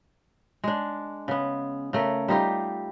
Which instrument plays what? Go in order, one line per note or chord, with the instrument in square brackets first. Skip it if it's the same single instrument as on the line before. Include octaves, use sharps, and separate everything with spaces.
[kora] G#3 D4
C#3 B3
C#3 A3 A#4
G3 D#4 F4 G4